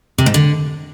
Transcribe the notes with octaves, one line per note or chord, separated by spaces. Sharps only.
C3
G#2
D3